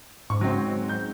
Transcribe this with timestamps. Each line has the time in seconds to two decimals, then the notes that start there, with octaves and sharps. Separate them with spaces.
0.30 G#2 C#6
0.41 F#3 C4
0.89 G6